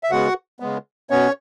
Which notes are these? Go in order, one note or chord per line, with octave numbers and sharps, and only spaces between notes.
E5
C#3 G#3 B3 F#4 F#5
C#3 G#3 B3
B2 B3 C#4 C#5